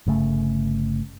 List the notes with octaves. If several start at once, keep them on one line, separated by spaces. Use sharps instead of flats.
G1 C#3 A3